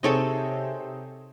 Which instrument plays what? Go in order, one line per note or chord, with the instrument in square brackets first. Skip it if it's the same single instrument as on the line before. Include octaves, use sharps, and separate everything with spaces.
[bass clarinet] C3 [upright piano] C4 D#4 G#4 [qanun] A4 C#5 D#5